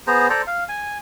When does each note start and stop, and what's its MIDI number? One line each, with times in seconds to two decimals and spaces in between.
0.07 0.28 59
0.07 0.28 68
0.07 0.28 72
0.07 0.28 82
0.30 0.42 69
0.30 0.42 72
0.30 0.42 74
0.30 0.42 82
0.47 0.64 77
0.69 0.98 80